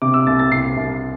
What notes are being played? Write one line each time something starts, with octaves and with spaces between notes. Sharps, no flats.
C3 D6
E6
C2 A6
A6
C2 C7
C2